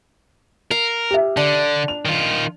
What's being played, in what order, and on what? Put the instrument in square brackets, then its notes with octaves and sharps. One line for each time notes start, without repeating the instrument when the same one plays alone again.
[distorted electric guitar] A#4 [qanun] F5
[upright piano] G4 E5
[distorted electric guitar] D3 [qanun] D4 A5
[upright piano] F7
[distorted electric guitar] D#3 F4